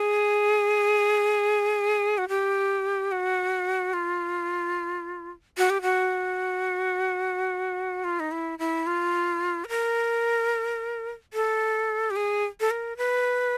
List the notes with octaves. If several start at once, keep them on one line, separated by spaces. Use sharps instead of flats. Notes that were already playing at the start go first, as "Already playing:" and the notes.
Already playing: G#4
F#4
G4
F#4
F4
F#4
G4
F#4
F4
D#4
E4
E4
F4
B4
A#4
A4
G4
G#4
A4
A#4
B4